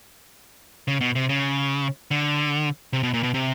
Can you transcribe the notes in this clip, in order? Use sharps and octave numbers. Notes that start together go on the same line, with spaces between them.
C#3
B2
C3
C#3
D3
C3
B2
A#2
B2
C3